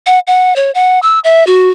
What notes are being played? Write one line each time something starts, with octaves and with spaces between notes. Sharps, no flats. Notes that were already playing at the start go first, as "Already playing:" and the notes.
F#5
F#5
C#5
F#5
E6
E5
F#4